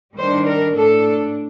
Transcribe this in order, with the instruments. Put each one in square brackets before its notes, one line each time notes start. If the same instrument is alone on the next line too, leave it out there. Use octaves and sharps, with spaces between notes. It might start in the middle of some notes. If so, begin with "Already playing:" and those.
[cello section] D#3 G3 D4 C5
A#4
A2 A3 D4 A4